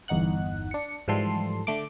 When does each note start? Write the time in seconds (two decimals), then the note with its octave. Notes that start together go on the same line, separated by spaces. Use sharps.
0.08 G1 E2 D#4 F#5 F#6
0.71 D4 C#7
1.08 G#2 E3 F3 G3 A4 C6
1.67 D3 A3 D6